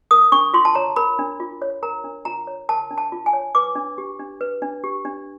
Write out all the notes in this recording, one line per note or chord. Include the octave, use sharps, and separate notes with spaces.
A#4 D#6
D4 C#6
F4 C6
A5
C#5 A#5
A#4 B5
D4
F4
C#5
A#4 A#5
D4
F4 A#5
C#5
A#4 A5
D4
A5
F4
G#5
C#5
B4 D6
D4
G4
D4
B4
D4
G4
D4